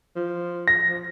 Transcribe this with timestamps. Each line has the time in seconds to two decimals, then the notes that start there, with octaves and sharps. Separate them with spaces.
0.16 F3
0.68 A#6
0.89 F3